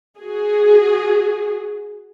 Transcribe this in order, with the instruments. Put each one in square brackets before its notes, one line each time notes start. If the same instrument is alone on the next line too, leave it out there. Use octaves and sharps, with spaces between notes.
[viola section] F#4 G#4